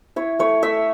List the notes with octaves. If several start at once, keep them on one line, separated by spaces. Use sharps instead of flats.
E4 C#5
A3 C#5
A3 E5